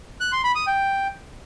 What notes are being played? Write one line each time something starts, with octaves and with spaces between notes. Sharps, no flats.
F#6
C6
B5
D#6
G5